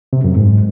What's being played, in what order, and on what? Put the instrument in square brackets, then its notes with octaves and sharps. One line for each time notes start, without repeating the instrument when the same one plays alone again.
[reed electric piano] C3
F#2
G#2